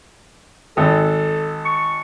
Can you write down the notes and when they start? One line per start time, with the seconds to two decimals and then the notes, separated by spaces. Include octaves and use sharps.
0.77 G#1 A4
1.65 C#6